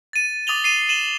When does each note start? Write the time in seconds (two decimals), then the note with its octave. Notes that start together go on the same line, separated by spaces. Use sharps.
0.13 A6 D#7
0.47 D6 D#6 A6 F7 G7
0.64 C7 D#7
0.89 D#7 E7 F#7 G7